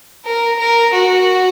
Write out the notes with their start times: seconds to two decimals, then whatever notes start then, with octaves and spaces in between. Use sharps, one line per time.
0.25 A#4
0.59 A#4
0.93 F#4